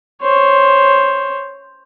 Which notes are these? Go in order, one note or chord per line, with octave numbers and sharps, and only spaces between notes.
C5 C#5